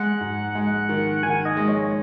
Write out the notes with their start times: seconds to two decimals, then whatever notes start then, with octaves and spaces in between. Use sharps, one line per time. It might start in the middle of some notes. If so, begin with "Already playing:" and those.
Already playing: G#3 F#5
0.21 G#2
0.55 G#3
0.89 D#3
1.23 D#3 G#5
1.45 D#5
1.57 G#3
1.68 C#5